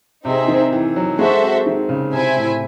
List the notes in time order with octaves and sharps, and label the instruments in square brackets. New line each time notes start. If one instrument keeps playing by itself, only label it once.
[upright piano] C3 [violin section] C4 D#4 G#4 C5 E5
[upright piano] D#3
E3
F#3
[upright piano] G#3 [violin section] F#4 A4 C5 E5
[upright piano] C4
D#3
C#3
[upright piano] C3 [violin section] E4 C5 E5 G#5
[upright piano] A2